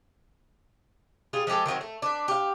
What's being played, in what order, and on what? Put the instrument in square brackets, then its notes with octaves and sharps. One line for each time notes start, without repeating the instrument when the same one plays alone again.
[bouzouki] G3 F4 G#4
F3 G#3 G4 A4
D#3 F3 F#3 C4
A3
D4 B4
G4 F5